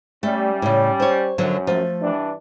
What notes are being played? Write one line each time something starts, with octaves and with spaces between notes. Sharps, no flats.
G3 A3 C#4
A2 C#3
C5 C#5
F#2 D3 F3 F#3
F3 A3
G2 E3 D4